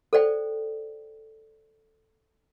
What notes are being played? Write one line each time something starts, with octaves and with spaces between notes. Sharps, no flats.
A4 C5 D5 G5